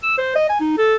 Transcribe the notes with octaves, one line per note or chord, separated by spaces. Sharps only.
E6
C5
D#5
G#5
D#4
A4